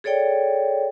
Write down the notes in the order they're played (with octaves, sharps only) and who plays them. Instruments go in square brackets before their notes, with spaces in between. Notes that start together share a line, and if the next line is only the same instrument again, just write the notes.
[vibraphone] G#4 A4 C#5 D5 G5